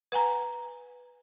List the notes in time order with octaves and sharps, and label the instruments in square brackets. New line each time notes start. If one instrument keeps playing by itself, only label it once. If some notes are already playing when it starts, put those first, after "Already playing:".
[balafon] B4 F#5 G#5 A#5